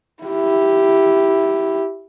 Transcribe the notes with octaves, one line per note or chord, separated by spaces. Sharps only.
E4 G4